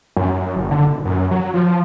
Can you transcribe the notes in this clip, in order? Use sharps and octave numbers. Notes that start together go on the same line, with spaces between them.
F#2
F#2
F#1
D3
D#1
F#2
F#3
F3